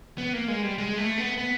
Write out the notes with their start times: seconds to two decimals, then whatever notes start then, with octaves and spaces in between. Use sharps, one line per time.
0.18 B3
0.33 A#3
0.48 G#3
0.62 G3
0.78 G#3
0.98 A3
1.17 B3
1.37 B3